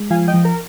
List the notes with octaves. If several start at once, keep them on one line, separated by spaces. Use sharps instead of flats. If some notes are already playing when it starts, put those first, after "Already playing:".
Already playing: G#3
F3 F5 G#5
D#5 G5
F3
A#4